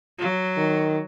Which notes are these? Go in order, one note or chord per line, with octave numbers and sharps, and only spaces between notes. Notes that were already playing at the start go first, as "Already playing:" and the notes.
F#3
D#3